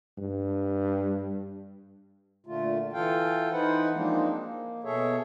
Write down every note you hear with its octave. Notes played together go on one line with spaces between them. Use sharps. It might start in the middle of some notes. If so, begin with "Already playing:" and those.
G2
A#2 D3 A3 F4
E3 F4 A4 F5 G5
E3 D#4 B4 C5 F#5
F3 G#3 A#3 C4 D4 D#4
A#3
B2 G#4 A4 C#5 E5